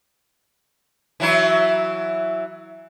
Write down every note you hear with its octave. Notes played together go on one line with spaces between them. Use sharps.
E3 F#3 E4